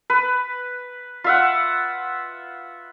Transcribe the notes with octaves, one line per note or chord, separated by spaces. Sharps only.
B4
F4 E5 F#5